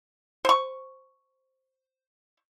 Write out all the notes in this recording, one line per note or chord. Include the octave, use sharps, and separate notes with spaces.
C5 C#6